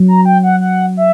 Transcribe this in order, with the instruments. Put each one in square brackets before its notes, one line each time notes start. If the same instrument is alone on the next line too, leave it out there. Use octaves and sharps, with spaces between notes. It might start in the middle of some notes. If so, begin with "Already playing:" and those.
Already playing: [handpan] F#3
[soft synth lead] A#5
G5
F#5
F#5
E5